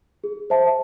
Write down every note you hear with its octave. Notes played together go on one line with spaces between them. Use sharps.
G#4
C5 E5 A5